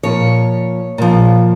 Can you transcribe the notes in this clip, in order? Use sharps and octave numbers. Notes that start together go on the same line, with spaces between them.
A#2 F3 C#5
A#2 F3